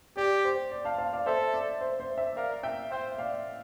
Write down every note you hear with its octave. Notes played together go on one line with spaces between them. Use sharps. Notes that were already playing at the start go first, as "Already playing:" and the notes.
G4 D5
C5
D5
F5 A5
F5 A5
D5 F5
A4 C5 E5
D5
C5
C5
C5 E5
A#4 D5 F5
E5 G5
C5 E5 G5
D5 F5